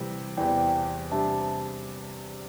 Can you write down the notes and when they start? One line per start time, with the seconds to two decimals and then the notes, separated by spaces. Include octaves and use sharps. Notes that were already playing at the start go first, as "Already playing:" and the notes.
Already playing: C3 E3 G3
0.37 E2 C3 E3 D5 G5
1.11 C3 G3 D4 E5 A5